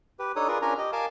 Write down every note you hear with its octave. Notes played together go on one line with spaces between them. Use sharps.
G4 B4
D4 D#4 A4 C#5 D#6
F4 G#4 A#4 B4 D5
C#4 D4 F4 A#4 G#5 A#5
G4 D#5
A#4 F5 G#5 A5 D6